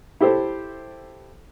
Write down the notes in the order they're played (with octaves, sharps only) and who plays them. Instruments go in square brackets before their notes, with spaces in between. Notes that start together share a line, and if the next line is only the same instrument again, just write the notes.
[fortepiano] E4 G4 A4 C5